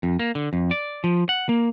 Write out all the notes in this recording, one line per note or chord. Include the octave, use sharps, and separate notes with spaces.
F2
A#3
D3
F2
D5
F3
F#5
A#3